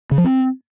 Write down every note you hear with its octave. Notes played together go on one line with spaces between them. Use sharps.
C#3
F3
C4